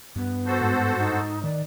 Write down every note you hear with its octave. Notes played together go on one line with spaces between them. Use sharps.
G2 B3
F#4 A4 C5
G#2
D#4
D#3 D5